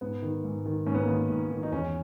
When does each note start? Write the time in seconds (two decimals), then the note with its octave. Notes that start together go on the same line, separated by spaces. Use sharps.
0.01 G#2 B3
0.22 D#3
0.44 G#2
0.66 D#3
0.86 G#2 C#4
0.95 B3
1.03 A#3
1.08 D#3 B3
1.30 G#2
1.50 D#3
1.63 D#4
1.72 E2 C#4